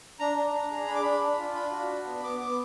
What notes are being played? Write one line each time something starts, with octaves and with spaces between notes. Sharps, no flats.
D4 A#5
D4
D4
G#4
D4 B5
D6
D4 B5
D4
F4
D4 B5
F#4
D4
B3
B3 D6
B3 D6